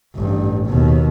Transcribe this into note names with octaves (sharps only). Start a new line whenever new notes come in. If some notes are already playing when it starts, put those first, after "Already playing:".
A1 G2
D#2 B2